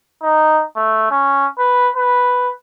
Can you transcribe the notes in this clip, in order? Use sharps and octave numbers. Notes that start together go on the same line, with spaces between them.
D#4
A3
C#4
B4
B4